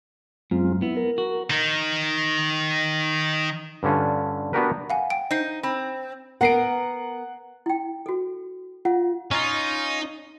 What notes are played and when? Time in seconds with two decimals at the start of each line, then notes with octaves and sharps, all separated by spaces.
0.51 F#2 G#3 C4 F4
0.82 B3 E4
0.97 A#4
1.18 F#4
1.50 D#3 D#4
3.83 G2 D3 C#4 F4
4.53 B3 D4 F#4 G4 A#4 B4
4.90 F5 F#5 G#5
5.10 G5 D7
5.31 D#4 C5 G6 C7
5.63 C4 B5
6.41 B3 A#4 F#5 C7 D7
7.66 E4 G5
8.06 F#4 A4
8.85 F4 F#5
9.31 C#4 D#4 F4